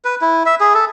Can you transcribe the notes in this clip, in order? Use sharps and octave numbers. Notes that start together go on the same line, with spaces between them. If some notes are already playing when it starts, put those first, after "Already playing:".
B4
E4
E5
G#4
A4